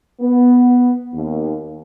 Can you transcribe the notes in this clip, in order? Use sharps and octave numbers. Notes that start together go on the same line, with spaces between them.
B3
D#2